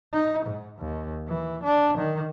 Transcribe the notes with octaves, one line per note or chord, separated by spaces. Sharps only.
D#4
G#2
D#2
E3
D4
D#3